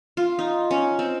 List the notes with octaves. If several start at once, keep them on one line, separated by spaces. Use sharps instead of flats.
F4
D#4
C#4
C4